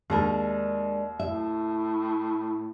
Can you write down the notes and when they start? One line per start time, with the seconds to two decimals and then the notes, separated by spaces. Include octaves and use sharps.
0.10 D#2 G#3 D4 A#4
1.20 A2 E5